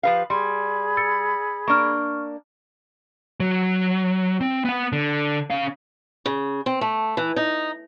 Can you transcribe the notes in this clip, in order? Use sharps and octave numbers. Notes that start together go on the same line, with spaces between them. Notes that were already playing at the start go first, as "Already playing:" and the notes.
F3 G4 B4 F5
G3 G#4 B5 C6
E6 A6 C#7
A#3 D4 C#6 F6
F#3
C4
B3 F#5
D3
C#4 F5
C#3
C4
A3
E3
D#4